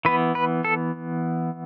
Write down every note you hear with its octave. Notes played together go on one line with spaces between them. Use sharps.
E3 B3 B4
B4
A4